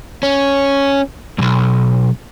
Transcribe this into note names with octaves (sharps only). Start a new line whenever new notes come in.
C#4
B1 F#2